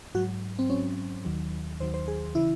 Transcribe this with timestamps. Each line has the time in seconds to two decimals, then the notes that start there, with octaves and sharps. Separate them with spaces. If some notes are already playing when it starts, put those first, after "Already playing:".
0.15 G#2 F#3 F#4
0.59 C4
0.70 G#2 F#3 C#4
1.25 D#2 D#3 F#3
1.80 D#2 D#3 F#3 C5
1.94 C5
2.08 G#4
2.35 C#3 E3 E4